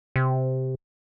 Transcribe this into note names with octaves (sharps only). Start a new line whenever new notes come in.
C3